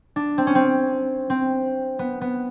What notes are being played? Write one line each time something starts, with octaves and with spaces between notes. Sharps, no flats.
D4
C4
C#4
C4
C4
B3
B3